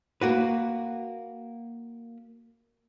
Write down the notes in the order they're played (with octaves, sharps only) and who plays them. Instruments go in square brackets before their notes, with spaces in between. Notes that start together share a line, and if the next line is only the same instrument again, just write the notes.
[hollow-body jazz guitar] A#3 F#4 B4